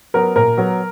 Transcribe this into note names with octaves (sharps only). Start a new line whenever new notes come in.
F#3 B3 A#4
A#2 A#4
F#3 B3